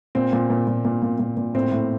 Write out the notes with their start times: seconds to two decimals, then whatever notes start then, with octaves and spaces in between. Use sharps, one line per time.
0.15 A#2 C4
0.33 A#2
0.50 A#2
0.67 A#2
0.85 A#2
1.02 A#2
1.19 A#2
1.37 A#2
1.54 A2 C4
1.72 A2